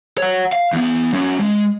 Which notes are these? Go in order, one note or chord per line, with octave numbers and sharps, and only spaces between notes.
C#5 F#5
F5
E2 B3
F#3 C#4
G#3